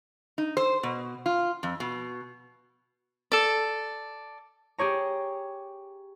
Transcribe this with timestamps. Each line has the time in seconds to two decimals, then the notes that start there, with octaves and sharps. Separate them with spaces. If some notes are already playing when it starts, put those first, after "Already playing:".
0.38 D#4
0.57 C5
0.83 B2
1.26 F4
1.63 F2
1.80 B2
3.32 A4 D5
4.78 G4 G#4 C#5 A#5